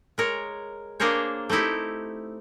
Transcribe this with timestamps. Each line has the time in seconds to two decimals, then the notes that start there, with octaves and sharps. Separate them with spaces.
0.18 G#3 A#4 C#5
1.00 A#3 D4 G#4 A#4 C5 C#5
1.50 A3 C4 D#4 E4 G4